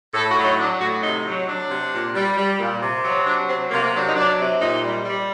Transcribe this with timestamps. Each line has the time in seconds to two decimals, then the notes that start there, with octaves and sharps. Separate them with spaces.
0.14 A2 A4
0.29 F#4
0.37 F#3
0.44 D#4
0.58 F#3 D4
0.81 A2 F#4
1.03 C3 D#4
1.26 F#3
1.48 F#3 D4
1.71 C3
1.93 A#2
2.15 G3
2.38 G3
2.59 A#2
2.82 C3
3.04 F#3
3.26 F#3 D4
3.48 C3 C4
3.71 C3 A#3
3.82 A#3
3.93 F#3 D4
4.04 D#4
4.16 F#3 D4
4.39 C3
4.60 A#2 D#4
4.82 G3
5.05 G3